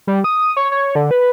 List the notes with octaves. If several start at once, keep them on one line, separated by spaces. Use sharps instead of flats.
G3
D#6
C#5
C#5
D3
B4